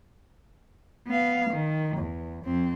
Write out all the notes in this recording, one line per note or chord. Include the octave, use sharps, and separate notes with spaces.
B3 F5
D#3
E2
F2 C4